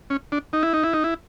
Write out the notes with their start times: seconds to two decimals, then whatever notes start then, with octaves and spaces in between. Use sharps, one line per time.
0.10 C#4
0.32 D4
0.53 D#4
0.63 E4
0.73 D#4
0.84 E4
0.93 D#4
1.04 E4